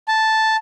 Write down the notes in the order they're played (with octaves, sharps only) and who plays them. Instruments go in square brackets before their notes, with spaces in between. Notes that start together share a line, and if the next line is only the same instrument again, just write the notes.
[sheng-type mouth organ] A5